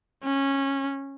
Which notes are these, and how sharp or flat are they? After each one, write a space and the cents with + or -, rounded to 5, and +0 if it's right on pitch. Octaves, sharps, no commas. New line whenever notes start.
C#4 -15